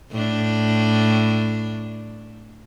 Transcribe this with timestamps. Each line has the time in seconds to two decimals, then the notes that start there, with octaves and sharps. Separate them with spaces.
0.11 A2 D4